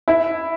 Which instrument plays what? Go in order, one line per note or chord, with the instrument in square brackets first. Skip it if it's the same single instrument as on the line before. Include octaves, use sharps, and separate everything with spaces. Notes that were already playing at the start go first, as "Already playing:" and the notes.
[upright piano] E4